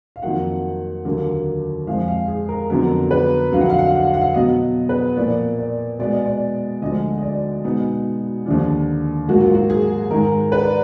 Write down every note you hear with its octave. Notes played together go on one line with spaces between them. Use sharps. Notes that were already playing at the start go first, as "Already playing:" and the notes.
F5
F2 D#3 F#3 A#3 F#5
D#2 D3 F#3 A#3
F2 F3 G#3 F5
F5
G#4
A#4
F2 D3 F#3 B3 A#4
B4
F2 D3 F#3 F5
F#5
F5
F#5
F5
F#5
F5
F#5
F5
B2 F#3 B3 D#5
B4
A#2 F3 A#3 D5
D5
B2 G#3 B3 D5
D#5
D5
D2 D3 F3 G#3 D#5
D#5
D5
B2 G#3 B3 D#4
D#2 D3 F3 D4
G#2 F#3 A#3 F#4
F4
F#4
G#4
G#2 D#3 G#3 A#4
B4
D5